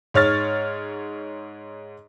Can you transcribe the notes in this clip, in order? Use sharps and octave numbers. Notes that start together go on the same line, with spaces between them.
G#2 C#5 F6 A6